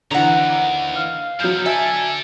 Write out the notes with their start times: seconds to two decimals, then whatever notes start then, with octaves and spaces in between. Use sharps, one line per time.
0.11 D#2 D3 E3 F#5 A#5
0.96 F5
1.40 F3 F#3 B3 G6
1.66 A4 D5 E5 G#5 A5